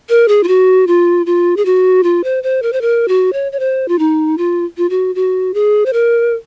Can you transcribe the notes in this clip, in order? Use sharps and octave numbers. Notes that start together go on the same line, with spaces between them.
A#4
G#4
F4
F#4
F4
F4
G#4
F#4
F4
C5
C5
A#4
C5
A#4
F#4
C#5
C#5
C5
F4
D#4
F4
F4
F#4
F#4
G#4
C5
A#4